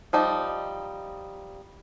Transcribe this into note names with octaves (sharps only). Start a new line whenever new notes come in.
F3 G3 D#4